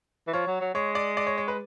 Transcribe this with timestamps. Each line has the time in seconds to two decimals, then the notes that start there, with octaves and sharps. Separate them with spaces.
0.28 E3
0.33 F3 C#5
0.47 F#3
0.61 F#3
0.75 G#3 C#5
0.95 D5
1.17 D5
1.27 C#5
1.38 C#5
1.48 B4